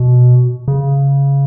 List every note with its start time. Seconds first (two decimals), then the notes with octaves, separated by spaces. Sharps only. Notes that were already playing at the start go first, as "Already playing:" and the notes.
Already playing: B2
0.68 C#3